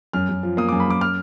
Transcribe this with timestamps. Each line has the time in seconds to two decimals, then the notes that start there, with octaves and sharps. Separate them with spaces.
0.13 F#2 F6
0.29 F#2
0.43 F3
0.57 A#3 D#6
0.69 D6
0.72 F#2
0.80 B5
0.88 F#2 D6
1.01 F6